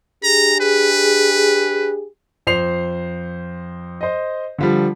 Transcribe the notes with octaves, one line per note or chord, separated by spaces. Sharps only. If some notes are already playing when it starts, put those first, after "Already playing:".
D4 G4 G#4 A#5
B4
F2 C5 C7 F7
C5 D#5
D3 F3 G3